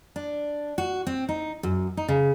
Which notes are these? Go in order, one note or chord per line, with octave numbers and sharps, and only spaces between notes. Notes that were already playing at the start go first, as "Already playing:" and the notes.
D4
F#4
C4
D#4
F#2
D#4
C#3